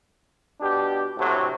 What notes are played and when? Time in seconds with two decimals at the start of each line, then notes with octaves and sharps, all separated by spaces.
0.61 B2 D4 G4
1.18 D2 A2 C3 F#3